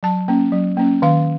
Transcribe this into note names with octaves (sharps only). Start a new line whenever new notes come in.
F#3 A5
A#3 C#4
F#3
A#3 C#4
D#3 F5